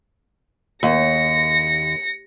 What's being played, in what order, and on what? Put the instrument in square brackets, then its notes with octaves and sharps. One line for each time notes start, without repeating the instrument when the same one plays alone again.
[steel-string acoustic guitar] D#2 [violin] A#6 C#7